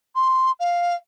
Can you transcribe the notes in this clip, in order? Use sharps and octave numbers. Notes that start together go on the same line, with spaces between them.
C6
F5